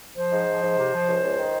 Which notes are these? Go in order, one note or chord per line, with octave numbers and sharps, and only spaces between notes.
F3 C5
G#2
F3
G#2
C3
F3
C#2
C#2
D#3